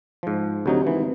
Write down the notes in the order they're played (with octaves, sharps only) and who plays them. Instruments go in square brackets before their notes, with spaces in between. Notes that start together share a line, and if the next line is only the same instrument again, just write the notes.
[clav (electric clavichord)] G#2 F3
[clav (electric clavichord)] D2 F#3 D#4 [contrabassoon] C3
[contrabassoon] G#1 [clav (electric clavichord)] E3